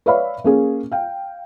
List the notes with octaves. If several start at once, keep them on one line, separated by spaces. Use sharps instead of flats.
B4 C#5 D5 E5 F5 B5
A#3 C#4 G#4
F5 G5